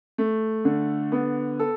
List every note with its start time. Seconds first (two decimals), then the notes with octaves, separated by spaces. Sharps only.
0.18 A3
0.65 D3
1.12 B3
1.59 A4